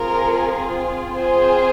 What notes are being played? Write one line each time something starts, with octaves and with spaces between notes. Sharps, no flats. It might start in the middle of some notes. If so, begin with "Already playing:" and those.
Already playing: C4 F4 G#4 A#4
C4 F4 G#4 C5